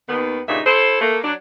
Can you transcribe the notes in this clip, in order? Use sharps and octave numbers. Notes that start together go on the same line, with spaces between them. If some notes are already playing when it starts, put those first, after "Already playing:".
D#2 D#3 B3
G2 A#2 C#3 D#4 E5
E4 A4 C5
A3 A#3
F#3 D4